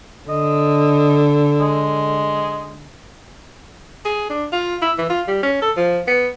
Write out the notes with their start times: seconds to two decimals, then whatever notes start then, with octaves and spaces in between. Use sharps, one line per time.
0.29 D3 D#5
1.60 G#3
4.05 G#4
4.30 D4
4.52 F4
4.82 E4
4.98 E3
5.10 F4
5.28 G3
5.43 C#4
5.62 A4
5.76 F3
6.07 B3